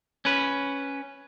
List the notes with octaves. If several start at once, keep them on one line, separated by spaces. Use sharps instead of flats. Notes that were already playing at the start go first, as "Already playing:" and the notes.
C#4 B4